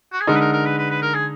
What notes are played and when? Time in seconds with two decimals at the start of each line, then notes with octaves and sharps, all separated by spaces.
0.13 F#4
0.20 G#4
0.27 D3 G#3 D#4 A#4
0.35 B4
0.40 A#4
0.53 A#4
0.65 B4
0.78 B4
0.90 B4
1.02 A#4
1.14 G#4